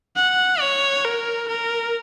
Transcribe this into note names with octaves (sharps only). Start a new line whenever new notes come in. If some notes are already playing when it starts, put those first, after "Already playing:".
F#5
C#5
A#4
A#4